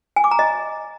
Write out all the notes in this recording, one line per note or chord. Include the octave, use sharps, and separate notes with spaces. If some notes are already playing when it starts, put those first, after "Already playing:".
G#5
D6
A#5
D#5